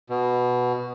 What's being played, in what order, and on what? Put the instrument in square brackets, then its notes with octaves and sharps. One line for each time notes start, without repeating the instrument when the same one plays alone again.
[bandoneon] B2